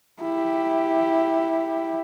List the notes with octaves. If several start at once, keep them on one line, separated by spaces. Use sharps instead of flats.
E4 G4